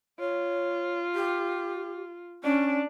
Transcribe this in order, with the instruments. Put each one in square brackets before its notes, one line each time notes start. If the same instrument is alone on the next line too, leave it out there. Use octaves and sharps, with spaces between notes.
[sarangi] F4 [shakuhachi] C#5
[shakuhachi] G4
[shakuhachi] C#4 [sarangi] D4